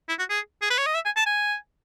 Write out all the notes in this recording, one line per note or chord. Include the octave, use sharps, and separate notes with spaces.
E4
F#4
G#4
G#4
B4
C#5
D#5
E5
G#5
A5
G#5